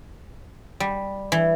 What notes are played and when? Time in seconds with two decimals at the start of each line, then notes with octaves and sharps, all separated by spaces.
0.80 G3
1.32 E3